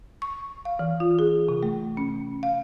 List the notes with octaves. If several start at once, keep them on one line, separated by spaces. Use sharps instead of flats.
C#6
F5
E3
F4
G#4
C3
A3
C#4
F5